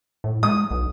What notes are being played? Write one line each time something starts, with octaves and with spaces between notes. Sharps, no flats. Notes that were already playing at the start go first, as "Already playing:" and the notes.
A2
G#3 D#6
B1